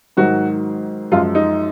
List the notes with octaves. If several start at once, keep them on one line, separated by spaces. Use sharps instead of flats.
G#2 D#3 F#3 F#4
F#2 F3 G#3 F4
D#4